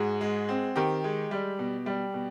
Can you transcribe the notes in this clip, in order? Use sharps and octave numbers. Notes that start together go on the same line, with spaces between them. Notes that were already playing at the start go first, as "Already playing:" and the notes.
Already playing: G#2 F#4 G#4
G#3
C4
D#3 G4
G#3
G3
B2
G3
B2